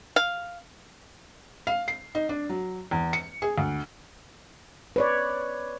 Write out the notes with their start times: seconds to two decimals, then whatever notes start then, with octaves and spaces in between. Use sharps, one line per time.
0.16 F5
1.67 F5
1.88 C7
2.15 D#4
2.29 D4
2.49 F#3
2.91 E2
3.13 C#7
3.42 G#4
3.58 D2
4.96 B4 C#5 D5